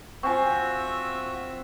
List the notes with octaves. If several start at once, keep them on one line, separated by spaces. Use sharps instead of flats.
C4 F4 F#4 E5 G#5 C#6